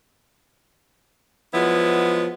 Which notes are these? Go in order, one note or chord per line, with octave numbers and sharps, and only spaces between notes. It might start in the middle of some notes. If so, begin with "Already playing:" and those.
F3 F#3 G#3 B3 E4